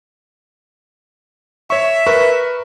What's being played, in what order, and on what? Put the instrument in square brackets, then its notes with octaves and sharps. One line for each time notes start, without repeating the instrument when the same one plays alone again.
[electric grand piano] C#5 C#6 [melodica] E5
[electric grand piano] A#4 B4 C#6